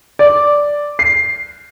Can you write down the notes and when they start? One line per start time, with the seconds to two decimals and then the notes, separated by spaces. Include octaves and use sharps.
0.19 D5
0.99 C7